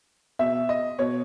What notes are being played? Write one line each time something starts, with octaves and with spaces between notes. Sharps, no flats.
B2 E5
D#5
B2 C#5